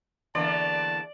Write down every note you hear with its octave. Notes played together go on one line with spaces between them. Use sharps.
E2 D3 A#3 D5 A5